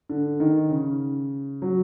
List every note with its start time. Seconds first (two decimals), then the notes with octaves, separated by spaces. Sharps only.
0.09 D3
0.40 D#3
0.70 C#3
1.62 F#3